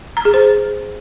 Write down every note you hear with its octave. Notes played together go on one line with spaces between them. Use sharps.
A#5
G#4
C5